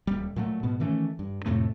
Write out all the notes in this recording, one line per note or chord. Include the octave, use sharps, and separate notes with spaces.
D#1 G3
A#2 F#3 A3
G#2 B2 B3
D#3 E3 A3 C#4
G2
F2 A2 C3 A3